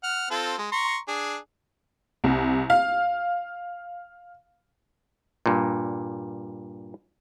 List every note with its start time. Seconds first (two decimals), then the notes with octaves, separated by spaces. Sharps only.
0.03 F#5 F6
0.31 C4 F4 A4
0.58 G#3
0.72 A#5 C6 C#6
1.08 D4 G#4
2.24 C2
2.70 F5
5.46 G2 A#2